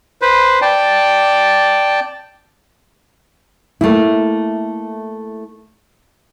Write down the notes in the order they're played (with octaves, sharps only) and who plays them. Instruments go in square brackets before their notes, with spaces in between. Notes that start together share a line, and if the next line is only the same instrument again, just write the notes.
[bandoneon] B4 C5
D5 G5 A5
[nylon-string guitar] A3 A#3 E4